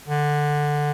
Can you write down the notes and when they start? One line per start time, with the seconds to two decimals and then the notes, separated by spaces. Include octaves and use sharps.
0.08 D3